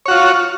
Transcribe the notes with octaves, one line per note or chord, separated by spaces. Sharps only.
F4 F#4 C#5